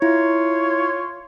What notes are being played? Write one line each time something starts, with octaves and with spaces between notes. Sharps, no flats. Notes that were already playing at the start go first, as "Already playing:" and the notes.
E4 F4 C#5